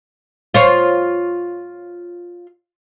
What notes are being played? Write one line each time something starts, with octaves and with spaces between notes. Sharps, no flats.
F4 C5 C#5